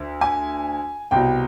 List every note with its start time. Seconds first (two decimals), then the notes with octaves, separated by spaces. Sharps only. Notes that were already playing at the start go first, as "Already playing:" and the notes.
Already playing: D2 D3
0.21 G#5
1.11 C2 B2 G5